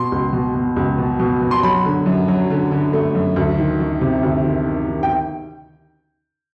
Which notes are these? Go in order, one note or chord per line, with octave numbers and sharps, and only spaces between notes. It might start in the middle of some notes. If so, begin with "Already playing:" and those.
Already playing: B2 C6
C#2
B2
B2
C#2
B2
B2
B2
C6
F#3 B5
D3
F#2
F#3
D3
D3
A3
F#2
D2
D#3
D#3
C3
D2
D#3
D#3
D#3
G5